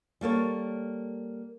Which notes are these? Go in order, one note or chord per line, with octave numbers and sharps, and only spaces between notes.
G3 A#3 A4 C#5